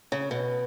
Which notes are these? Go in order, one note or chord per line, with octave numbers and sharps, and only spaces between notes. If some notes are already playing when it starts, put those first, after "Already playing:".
C#3
B2